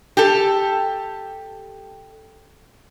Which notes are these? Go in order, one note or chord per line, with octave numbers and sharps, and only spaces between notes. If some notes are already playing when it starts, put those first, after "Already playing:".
G4 A4